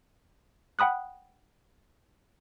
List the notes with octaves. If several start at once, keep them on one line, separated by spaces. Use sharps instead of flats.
F#5 G5 B5 D#6 F#6